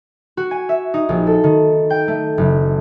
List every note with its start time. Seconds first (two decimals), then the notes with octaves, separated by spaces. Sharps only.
0.37 F#4
0.51 G#5
0.69 E5
0.94 D#4
1.09 A#1
1.27 A4
1.44 D#3
1.90 G5
2.08 A3
2.38 F#1